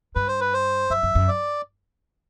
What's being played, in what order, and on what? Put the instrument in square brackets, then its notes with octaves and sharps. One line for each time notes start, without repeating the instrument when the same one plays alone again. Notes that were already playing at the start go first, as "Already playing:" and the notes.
[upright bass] G2 [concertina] B4
[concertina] C5
B4
C5
[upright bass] F#2 [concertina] E5
[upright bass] F#2
F#2
[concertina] D5